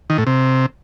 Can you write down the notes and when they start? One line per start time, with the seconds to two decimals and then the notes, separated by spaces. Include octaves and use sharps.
0.10 D#3
0.18 A2
0.27 C3